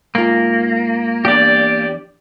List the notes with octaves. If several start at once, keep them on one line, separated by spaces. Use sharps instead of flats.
G#2 A#3 F4
E2 D4 G4 D5